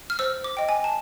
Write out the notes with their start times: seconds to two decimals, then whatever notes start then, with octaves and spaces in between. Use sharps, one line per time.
0.10 F6
0.19 C5 E6
0.44 D6
0.57 D#5 G5
0.69 G#5
0.84 A5